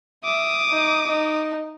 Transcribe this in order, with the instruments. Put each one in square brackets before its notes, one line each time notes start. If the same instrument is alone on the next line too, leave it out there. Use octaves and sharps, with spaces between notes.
[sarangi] E5 [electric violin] D6 D#6
[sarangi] D#4
D#4